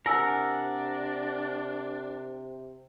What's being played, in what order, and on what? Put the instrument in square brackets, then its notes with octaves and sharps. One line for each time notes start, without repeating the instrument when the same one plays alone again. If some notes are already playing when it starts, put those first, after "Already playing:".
[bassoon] C3 [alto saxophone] D4 [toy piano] E4 G#5 E6 [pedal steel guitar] A#4 F#5 A#5